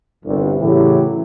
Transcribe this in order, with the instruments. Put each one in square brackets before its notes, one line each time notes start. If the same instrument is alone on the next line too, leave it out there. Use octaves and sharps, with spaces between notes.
[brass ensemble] G1 C2
A2 C#3 E3 F#3 E4 G4